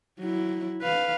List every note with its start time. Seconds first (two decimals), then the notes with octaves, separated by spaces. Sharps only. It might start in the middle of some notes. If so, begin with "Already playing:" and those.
0.20 F#3 E4
0.82 B4 F5